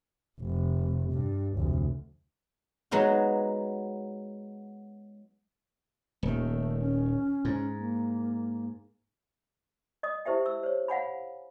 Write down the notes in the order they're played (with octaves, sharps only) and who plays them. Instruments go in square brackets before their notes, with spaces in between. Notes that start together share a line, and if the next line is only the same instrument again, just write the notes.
[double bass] F1
G2
F1 D2
[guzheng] F#3 G#3 B3 D#4 F#4
[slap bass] D#1 D#3 [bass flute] A3
[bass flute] C#4
[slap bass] G#2
[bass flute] A#3
[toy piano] D#5 D#6
E4 G4 C5 E5 G5
E6
C5 C#5
F5 F#5 G#5 B5